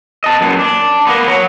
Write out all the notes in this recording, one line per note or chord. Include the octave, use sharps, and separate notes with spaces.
D#5 A5
F#2 A#2
D4
A#3 B3
F#3